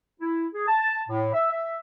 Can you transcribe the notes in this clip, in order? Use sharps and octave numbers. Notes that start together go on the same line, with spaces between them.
E4
G#4
A5
A2
E5
E5